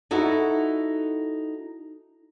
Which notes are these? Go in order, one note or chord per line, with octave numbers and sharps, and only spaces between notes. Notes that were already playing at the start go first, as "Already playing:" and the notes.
D#4 E4 F#4 A4